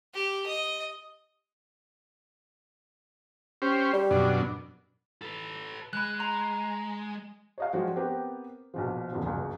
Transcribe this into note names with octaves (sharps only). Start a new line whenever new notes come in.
G4
D#5
C#4 G4 C5
G3
F#2 B2 D4
A4 B4
G#3 B5 F#6
A#5 C6
C#5 D#5 F5
F3 F#3 G#3 D4 F#4 G4
B3 C4 G4 A#4 B4
A#1 B2 F3
D#1 E2 E3 F3
G1 C#2 F#2